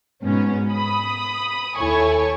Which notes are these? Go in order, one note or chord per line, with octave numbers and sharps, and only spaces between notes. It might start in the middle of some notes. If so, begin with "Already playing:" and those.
G#2 B2 B3 C#4
B5 D#6
D#2 E4 A4 C#5 G#5 C#6